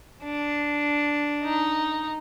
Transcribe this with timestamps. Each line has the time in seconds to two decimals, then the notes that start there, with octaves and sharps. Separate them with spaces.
0.24 D4
1.44 D#4